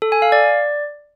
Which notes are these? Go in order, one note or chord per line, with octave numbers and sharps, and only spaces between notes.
A4
G#5
F5
D5